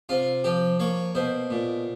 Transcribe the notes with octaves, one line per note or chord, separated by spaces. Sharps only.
C3 F4
F3 G4
A#3 C#5
B2 C5
A#2